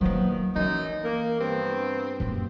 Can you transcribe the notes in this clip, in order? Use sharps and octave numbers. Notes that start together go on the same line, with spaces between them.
D#3 F3 F#3 A#3 B3
F#2 E3 D#4
A#3
G2 B3 C4
F#2 A#3